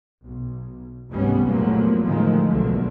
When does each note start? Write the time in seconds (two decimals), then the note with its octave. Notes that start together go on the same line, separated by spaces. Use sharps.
0.23 B1
1.10 F1 C#2 G#2 G3 B3 C#4
1.46 E2 A#2 F3 F#3 A3 A#3
2.04 A2 D3 D#3 F3 G#3 A3
2.49 B1 E2 D3 F#3 A3